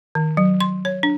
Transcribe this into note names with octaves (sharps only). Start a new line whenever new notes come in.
D#3
F#3
C6
C#5
D4